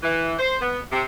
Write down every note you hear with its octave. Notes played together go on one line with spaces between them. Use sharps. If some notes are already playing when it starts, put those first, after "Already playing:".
E3
C5
B3
C3